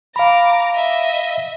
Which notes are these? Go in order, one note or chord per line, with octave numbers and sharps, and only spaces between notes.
F5 A#5 B5 D6
D#5 E5